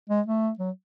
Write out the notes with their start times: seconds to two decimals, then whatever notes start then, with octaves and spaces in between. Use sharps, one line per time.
0.09 G#3
0.26 A3
0.58 F#3